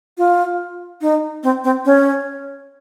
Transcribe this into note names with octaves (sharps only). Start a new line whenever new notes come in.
F4
D#4
C4
C4
C#4